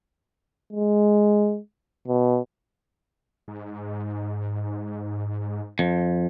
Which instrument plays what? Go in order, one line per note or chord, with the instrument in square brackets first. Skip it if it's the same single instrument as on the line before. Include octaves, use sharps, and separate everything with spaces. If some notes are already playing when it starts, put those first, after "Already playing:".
[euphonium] G#3
B2
[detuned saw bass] G#2
[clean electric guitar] F2